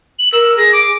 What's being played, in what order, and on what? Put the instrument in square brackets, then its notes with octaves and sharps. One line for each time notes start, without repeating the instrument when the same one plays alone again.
[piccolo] F#7
[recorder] A#4 [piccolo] E6
[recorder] G#4 [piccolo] A#6
[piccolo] D6